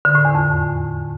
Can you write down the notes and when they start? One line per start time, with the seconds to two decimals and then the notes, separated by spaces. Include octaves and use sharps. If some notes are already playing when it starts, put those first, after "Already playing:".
0.05 D3
0.15 A2
0.25 E2
0.35 F2